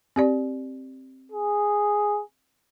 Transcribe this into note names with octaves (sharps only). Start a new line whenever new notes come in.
C4 G4 D5
G#4